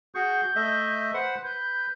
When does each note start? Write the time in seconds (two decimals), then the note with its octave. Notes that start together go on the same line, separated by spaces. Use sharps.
0.15 F#4 G#4 C#6 G6
0.56 A3 D#5 E5
1.14 B4 C5 F#5
1.44 B4 G6